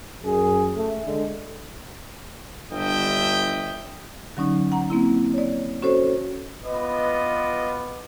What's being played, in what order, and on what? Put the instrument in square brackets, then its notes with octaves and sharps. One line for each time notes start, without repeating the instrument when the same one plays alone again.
[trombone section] F#2 G#4
A3
D3 G#3
[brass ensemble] G1 G2 D#5 E5 G5
[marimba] D3 F#3 C#4 D#4
F#5 A#5
A#3 C4 E4
C#5 D5
C#4 F#4 A4 C5 C#5
[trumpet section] B3 F4 B4 D#5 D6